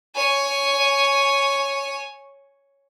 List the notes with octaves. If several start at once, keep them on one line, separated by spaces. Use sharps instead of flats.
C#5 G#5